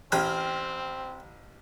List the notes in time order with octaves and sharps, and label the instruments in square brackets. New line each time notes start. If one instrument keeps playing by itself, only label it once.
[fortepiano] A1 [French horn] C4 [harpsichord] C5 G5 G#5 [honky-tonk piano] F6